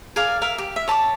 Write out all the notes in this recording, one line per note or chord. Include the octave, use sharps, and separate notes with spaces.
G#4 A#4 D5 F5
A#4 E5 F5
G4
E5
C#5 A5 B5 D6